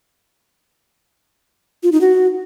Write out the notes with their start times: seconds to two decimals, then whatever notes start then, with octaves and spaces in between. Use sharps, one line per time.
1.83 F4
1.92 D#4
2.01 F#4